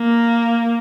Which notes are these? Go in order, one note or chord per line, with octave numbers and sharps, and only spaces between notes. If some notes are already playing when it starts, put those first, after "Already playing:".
Already playing: A#3